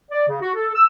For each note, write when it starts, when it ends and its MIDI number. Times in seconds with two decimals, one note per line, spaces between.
0.11 0.25 74
0.28 0.39 49
0.41 0.49 66
0.55 0.70 69
0.75 0.83 88